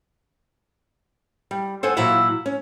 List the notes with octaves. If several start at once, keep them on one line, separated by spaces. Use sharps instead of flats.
G3
A4 C5 F#5 G#5
A#2 E3 F#3 E4 F#4 F5
C#4